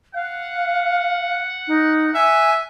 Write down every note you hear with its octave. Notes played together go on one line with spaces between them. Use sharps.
F5 F#5
D#4
E5 G#5